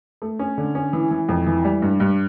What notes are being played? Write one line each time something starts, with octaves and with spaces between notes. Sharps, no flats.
A3
C#4
D3
C#4
E3
E3
F2
E3
G3
G2
G2